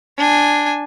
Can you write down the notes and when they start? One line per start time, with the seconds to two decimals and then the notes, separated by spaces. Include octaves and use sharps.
0.18 D4 G#5